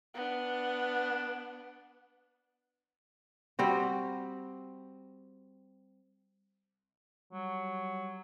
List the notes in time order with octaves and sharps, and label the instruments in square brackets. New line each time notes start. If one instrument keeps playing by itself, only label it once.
[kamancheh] B3 D4
[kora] G3 C4 F#4
[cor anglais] F#3 [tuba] G3